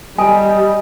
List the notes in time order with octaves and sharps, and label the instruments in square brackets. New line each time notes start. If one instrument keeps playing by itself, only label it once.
[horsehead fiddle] G3 [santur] D#5 [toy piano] G#5